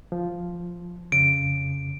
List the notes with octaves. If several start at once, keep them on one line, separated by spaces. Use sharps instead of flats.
F3
F2 C#3 D7